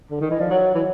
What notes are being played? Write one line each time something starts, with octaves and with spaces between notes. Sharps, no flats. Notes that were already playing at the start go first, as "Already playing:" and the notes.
D3
D#3
E3 D#5
F3 D5
F#3 C#5
E3